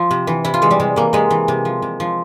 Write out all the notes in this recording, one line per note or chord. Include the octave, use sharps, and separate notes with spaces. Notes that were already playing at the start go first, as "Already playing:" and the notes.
Already playing: F3 F4
C3
E3
C3 E4
F4
E3 G#3
G3
C3 G#3
E3 A#3
C3 G#3
E3
C3
F3
C3
F3